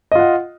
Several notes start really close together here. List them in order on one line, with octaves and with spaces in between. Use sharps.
D#5 F4 F#5